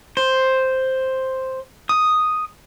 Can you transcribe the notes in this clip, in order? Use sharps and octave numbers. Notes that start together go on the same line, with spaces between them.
C5
D#6